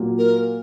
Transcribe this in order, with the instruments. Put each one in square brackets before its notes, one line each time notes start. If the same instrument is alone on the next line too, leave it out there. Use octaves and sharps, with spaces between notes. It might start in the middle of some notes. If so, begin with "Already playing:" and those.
Already playing: [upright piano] A#2 F#3 A#3
[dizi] A#4